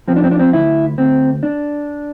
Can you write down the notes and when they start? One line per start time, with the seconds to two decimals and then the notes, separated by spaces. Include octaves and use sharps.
0.08 F3 C4
0.16 D4
0.24 C4
0.31 D4
0.39 C4
0.53 D2 E4
0.98 D2 C4
1.43 D4